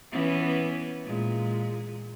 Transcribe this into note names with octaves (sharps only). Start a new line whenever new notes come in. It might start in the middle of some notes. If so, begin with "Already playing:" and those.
E3 B3 C#4
A#2 G#3